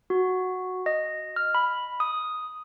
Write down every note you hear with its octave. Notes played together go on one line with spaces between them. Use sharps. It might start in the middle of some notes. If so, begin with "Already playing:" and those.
F#4
D#5
F6
B5
D#6